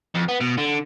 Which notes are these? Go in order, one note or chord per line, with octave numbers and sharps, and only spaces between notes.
F2
B3
B2
D3